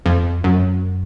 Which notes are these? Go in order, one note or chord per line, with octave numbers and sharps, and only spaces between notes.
F2
F#2